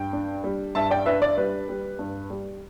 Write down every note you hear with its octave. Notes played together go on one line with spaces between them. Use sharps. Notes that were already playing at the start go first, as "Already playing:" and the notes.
Already playing: G2 G5
D4
G3
G2 E5 A5
D5 G5
D4 B4 E5
D5
G3 B4
G3
G2
G3